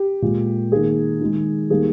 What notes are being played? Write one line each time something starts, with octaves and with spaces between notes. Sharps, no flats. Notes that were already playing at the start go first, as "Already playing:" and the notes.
Already playing: G4
A#2 G#3
D#3 A#3 G#4
D#3 G#3
D#3 G3 A#3 G#4